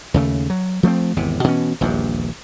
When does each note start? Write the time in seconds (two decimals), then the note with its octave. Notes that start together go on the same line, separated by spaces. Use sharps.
0.14 D#2 C#3 A3
0.50 F#3
0.83 F3 A3 A#3 C4
1.17 G#1 E2 C3
1.44 B2 E3 C#4
1.81 D#1 A#1 E2 G2